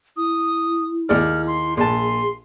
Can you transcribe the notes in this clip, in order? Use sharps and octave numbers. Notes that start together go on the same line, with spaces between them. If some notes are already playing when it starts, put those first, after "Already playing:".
E4 D#6
D#2 G#4 D5 F6
C6
A#1 G#4 A5 C6